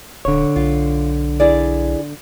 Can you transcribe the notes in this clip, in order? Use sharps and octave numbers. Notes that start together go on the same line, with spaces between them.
D#1 D3 C#5
B1 F4
E4 G#4 D5